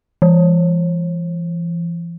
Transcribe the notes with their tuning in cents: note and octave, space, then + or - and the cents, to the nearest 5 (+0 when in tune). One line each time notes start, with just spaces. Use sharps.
E3 +45